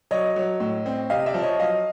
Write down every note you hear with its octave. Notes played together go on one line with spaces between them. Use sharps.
F#3 C#5 D#5
F#3
A2
C4
C3 D#5 F5
D5 E5
F3
C#5 D#5
F#3 D#5 F5